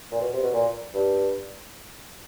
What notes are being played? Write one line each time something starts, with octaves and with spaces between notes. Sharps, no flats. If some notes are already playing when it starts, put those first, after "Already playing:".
A#2
B2
C3
B2
A#2
G2